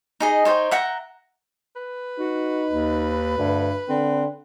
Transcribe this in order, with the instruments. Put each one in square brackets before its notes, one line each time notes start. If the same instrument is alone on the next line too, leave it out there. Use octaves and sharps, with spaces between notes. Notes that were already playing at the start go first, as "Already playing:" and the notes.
[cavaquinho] D#4 G#4 D#5
D#4 C5 C#5 G5
E5 F#5 G5 A#5
[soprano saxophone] B4
[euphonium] D#4 [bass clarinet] F#4
[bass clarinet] D#2
[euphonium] D2 [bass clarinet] G2
[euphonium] D3 [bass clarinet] C4